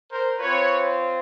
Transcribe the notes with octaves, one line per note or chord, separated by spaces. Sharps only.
A#4 C5
C4 F4 B4 C#5